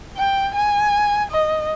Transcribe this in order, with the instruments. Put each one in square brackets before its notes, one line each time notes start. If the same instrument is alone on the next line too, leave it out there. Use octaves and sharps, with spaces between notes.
[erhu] G5
G#5
D#5